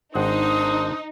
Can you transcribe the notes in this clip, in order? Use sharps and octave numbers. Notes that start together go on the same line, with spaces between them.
G#1 D4 D#4 C5 F#5 D#6